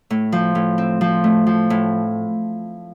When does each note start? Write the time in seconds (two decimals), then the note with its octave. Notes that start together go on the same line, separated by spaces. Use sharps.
0.10 A2
0.32 F3
0.55 A2
0.78 C4
1.01 F3
1.24 A3
1.47 F3
1.70 A2